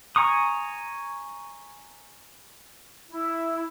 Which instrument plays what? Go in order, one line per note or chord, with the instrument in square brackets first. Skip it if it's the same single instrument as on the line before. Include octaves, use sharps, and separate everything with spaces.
[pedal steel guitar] G#5 A#5 C#6 D#6
[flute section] E4